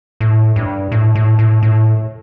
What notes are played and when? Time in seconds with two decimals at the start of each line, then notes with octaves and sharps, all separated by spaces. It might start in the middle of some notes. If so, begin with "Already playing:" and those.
0.21 A2
0.56 G2
0.92 A2
1.15 A2
1.39 A2
1.63 A2